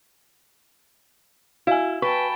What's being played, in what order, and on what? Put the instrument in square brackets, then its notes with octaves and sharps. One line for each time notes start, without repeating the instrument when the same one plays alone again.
[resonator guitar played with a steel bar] E4 [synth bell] F#4 G#5 [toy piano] F5
[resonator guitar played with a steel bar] B4 [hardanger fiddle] G5 A5 [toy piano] C#6